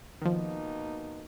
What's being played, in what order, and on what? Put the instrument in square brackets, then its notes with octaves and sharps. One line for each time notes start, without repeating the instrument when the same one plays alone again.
[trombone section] B2 A#3 D#4 [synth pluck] D#3 F3